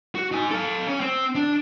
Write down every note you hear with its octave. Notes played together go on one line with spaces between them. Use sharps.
F#4
D#4 G#5
A4 F5
C#4
C4
D4